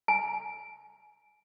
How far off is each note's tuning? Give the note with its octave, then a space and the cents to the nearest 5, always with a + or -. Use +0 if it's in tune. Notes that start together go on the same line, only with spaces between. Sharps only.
G#5 +25